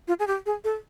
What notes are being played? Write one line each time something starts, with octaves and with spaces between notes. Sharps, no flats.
F4
G#4
G4
G#4
A4